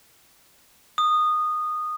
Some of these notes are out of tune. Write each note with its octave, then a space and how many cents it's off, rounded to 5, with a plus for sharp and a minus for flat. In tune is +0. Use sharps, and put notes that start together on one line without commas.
D#6 -15